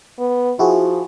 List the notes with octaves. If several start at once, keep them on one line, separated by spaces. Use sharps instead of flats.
B3
F3 E4 F#4 G#4